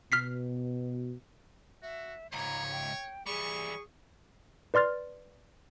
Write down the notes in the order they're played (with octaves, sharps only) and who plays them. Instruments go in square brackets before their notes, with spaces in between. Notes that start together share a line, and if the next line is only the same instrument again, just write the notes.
[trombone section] B2 [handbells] F6 B6 C7
[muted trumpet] F#4 [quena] E5
[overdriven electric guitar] C#2 G#2 [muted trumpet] C#5 [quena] A#5
[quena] G5
[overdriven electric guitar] E3 G3 [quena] G#4 [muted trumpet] C#6
[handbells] B4 D5 C6 F6 A6